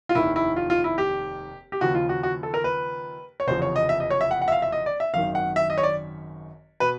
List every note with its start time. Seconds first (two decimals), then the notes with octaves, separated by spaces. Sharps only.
0.09 F4
0.15 F1 D#2 D#3 E4
0.36 E4
0.56 F4
0.70 F4
0.84 E4
0.98 G4
1.72 G4
1.81 D#2 C#3 F3 F#4
1.95 F4
2.09 F#4
2.23 F#4
2.43 A4
2.54 A#4
2.64 B4
3.40 C#5
3.47 F1 E2 C#3 F3 C5
3.62 C#5
3.76 D#5
3.89 E5
4.00 D#5
4.10 C#5
4.21 E5
4.31 F#5
4.41 F#5
4.48 E5
4.52 F5
4.62 E5
4.72 D#5
4.86 D5
5.00 E5
5.14 G#1 F#2 D#3 F5
5.35 F#5
5.56 E5
5.70 D#5
5.78 C#5
5.83 D5
6.80 B2 B4